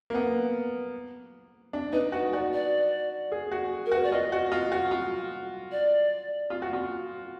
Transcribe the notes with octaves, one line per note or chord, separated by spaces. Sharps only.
A#3
B3
D4
D#4 B4
F#4 B4
F#4 D5
D5
G#4
F#4
A#4
F#4
B4
D5
F4 D#5
F#4
F4
F#4
F4
D5
F4
F#4
F4